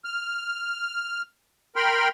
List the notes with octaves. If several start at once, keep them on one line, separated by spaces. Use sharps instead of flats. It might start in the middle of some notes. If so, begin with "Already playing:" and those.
F6
A#4 G5 B5 C6 F6